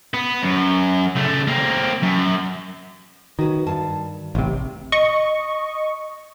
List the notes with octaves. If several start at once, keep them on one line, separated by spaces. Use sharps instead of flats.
B3
F#2
C#3 A3
A#3 C4
F#2
D#3 F#4 B4 C#5
G2 A5
A1 C3 D#3
D#5 C#6